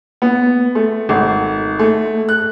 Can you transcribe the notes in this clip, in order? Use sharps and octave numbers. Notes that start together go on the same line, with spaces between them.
B3
A3
G#1
A3
F#6